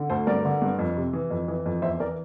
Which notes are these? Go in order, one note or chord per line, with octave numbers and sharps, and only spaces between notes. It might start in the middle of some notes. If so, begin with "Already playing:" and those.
Already playing: D3
D2 A4 C5
G2 A#4 D5
D3
G2
F2
C3
E3
F2
E3
F2
E2 C5 E5
E3 A#4 D5